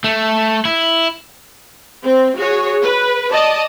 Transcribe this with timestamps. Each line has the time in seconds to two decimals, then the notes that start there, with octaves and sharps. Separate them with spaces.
0.04 A3
0.65 E4
2.03 C4
2.36 F#4 G#4 C#5
2.82 B4
3.32 D5 D#5 A5